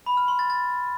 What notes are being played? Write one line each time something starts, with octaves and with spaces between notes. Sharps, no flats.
B5
F6
C6
A6
A6